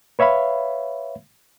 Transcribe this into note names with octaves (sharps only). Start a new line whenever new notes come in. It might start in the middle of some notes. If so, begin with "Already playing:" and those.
B4 C#5 E5 F5 B5